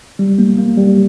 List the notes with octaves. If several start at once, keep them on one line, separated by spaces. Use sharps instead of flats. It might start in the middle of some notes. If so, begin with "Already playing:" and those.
G3
A#3
A#3
G3